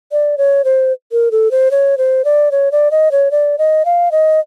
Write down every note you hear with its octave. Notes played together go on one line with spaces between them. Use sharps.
D5
C#5
C5
A#4
A4
C5
C#5
C5
D5
C#5
D5
D#5
C#5
D5
D#5
F5
D#5